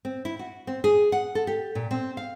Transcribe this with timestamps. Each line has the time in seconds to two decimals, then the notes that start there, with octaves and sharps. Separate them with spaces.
0.05 C4
0.25 E4
0.39 F#4
0.67 C4
0.84 G#4
1.12 F#5
1.35 A4
1.47 G4
1.75 A#2
1.91 C4
2.17 F5